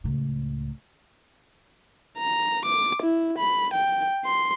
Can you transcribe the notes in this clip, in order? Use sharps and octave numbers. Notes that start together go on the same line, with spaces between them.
C#2 A2
A#5
D6
E4
B5
G5
C6